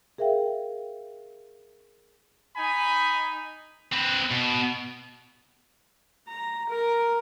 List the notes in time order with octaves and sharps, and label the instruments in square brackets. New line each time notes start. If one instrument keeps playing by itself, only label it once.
[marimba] G#4 A#4 E5 F5 G5
[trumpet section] D#4 G#5 B5
[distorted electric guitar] C4 B4
B2
[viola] A#5
A#4